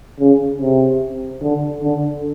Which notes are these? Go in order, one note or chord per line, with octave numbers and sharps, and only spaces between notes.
C#3
C3
D3
D3